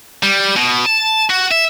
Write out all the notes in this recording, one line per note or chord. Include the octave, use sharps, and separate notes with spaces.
G3
B2
A5
F#4
E5